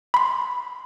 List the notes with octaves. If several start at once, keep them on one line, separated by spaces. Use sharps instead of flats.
B5 C6